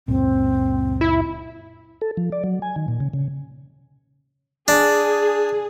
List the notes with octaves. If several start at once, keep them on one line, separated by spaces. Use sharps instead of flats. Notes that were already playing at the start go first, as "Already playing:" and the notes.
C#2 F#2 A#2 C4
E4
A4
F3
D5
F#3
G#5
D#3
A#2
C#3
C#3
D4 G#4